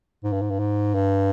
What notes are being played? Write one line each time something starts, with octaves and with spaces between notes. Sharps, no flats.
G#2
G2
G#2
G2
G#2
G2